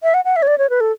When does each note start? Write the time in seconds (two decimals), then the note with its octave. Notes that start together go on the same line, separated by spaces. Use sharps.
0.03 E5
0.14 F#5
0.25 F#5
0.36 E5
0.42 C#5
0.47 D5
0.58 C#5
0.70 B4
0.81 A4